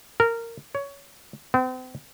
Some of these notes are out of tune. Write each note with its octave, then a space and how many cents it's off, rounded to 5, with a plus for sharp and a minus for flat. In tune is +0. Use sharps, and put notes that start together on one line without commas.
A#4 -15
C#5 +20
C4 -40